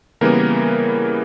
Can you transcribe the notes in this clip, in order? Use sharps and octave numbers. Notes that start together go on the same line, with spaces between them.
C#3 E3 G3 A#3 B3 A#4